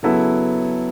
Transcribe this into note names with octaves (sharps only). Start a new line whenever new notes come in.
C#3 F#3 B3 E4 A4